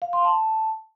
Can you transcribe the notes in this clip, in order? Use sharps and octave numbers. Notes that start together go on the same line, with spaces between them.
F5
C6
A5